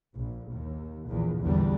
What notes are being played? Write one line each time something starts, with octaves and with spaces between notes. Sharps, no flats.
A#1
D#2
A#1 E2
A#1 E2 A2 D3 E3 G3